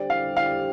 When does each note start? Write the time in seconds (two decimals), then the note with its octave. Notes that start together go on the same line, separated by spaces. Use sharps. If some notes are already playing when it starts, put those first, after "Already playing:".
Already playing: D3 G3 C4 G4 D5
0.10 F5
0.37 F5